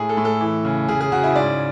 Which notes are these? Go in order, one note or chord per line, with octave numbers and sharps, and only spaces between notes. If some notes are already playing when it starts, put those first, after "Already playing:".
Already playing: A2 G#4
A4
A2
A4
E3
C#3
C#3 G#4
G#4
C#3 F#4
E4
G#2 D5